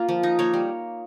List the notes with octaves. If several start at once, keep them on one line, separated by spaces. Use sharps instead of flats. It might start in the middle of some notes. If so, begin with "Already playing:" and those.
Already playing: A#3 F4
F3
D#4
A#3 C#5
G3